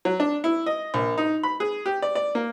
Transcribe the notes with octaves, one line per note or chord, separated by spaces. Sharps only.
F#3
D4
E4
D#5
A#1
D#4
B5
G#4
G4
D5
D5
A#3